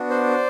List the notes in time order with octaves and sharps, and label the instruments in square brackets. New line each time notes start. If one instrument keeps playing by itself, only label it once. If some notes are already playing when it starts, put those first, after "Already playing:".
Already playing: [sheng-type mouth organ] B3 D4 F#4
C5 D5